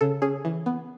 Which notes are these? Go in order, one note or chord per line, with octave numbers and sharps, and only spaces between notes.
C#3 A4
C#4 G#4
E3
B3